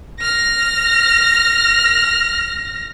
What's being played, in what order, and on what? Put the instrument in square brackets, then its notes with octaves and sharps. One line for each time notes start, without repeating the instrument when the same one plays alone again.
[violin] F6 A#6